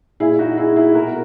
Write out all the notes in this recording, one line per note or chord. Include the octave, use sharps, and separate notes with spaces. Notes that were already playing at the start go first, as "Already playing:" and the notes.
A#2 E4 G#4
D#4 F#4
E4 G#4
E4 G#4
B2 F#4 A#4